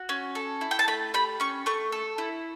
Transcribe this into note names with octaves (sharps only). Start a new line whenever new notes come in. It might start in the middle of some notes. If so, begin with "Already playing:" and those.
Already playing: F#4
C#4
A4
E4
G5
A5
A3 B5
G4 B5
C#4 C#6
A3 C#6
A4
E4